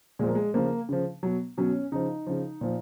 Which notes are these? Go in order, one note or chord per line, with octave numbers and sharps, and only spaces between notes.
A#2 F3 G#3 A#3
G#3
C#3 F3 A#3
C#3 F3
B2 F#3
B2 F#3 C#4
C#3 F3 D#4
C#3 F3
A#2 F3